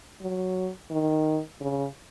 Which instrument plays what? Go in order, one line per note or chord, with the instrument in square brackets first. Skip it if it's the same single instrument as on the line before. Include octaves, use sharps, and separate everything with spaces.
[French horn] F#3
D#3
C#3